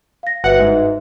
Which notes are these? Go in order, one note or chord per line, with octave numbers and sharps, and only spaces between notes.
F5 A#6
G1 F#4 B4 E5 F#5
G#2